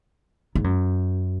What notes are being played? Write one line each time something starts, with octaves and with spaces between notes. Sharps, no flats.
G#2
F#2